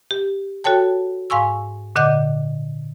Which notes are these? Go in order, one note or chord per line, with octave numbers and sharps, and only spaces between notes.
G4
F#4 A4 C#5 G5 A5
G#2 F5 G#5 C#6 E6
A#2 D3 D#5 F#5 D6 G6